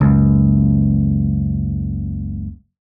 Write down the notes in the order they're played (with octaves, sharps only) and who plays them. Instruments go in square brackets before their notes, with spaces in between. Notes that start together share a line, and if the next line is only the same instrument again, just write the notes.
[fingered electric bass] F#1 C#2